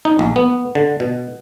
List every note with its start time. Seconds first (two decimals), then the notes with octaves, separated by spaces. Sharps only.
0.05 D#4
0.19 A#1
0.36 B3
0.75 D3
1.00 B2